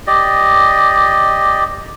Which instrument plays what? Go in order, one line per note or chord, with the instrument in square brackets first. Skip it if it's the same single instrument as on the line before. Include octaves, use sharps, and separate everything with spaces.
[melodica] G4 D5 D#5